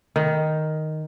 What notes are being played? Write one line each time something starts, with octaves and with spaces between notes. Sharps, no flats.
D#3